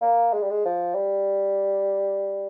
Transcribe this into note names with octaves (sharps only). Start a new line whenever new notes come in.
A#3
G#3
G3
G#3
F3
G3